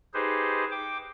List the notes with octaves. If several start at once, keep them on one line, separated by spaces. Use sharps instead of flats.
D#4 G4 G#4 B4 C5
G5 D6